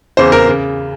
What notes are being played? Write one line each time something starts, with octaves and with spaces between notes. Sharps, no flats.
E2 C#3 E3 C5
A#4
C#3